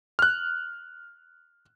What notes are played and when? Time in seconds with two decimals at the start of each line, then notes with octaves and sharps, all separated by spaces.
0.19 F6 F#6